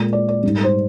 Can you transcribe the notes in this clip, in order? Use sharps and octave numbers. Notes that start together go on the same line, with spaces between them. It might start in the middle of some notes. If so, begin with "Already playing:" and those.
Already playing: A#2 G#3
D5
D5
G#2 G3
C5